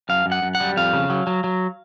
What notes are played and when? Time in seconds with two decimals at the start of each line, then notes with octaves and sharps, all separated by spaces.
0.09 F#2 F5
0.26 F#2
0.32 F#5
0.42 F#2
0.55 F#5
0.60 G3
0.77 F2 F5
0.93 C#3
1.10 F#3
1.27 F#3
1.44 F#3